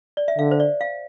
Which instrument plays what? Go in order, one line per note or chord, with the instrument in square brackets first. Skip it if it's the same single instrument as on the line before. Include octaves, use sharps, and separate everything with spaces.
[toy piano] D5
E5
[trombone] D3 [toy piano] F5
[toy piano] C5
D5
F5